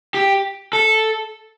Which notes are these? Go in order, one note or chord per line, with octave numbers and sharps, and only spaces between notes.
G4
A4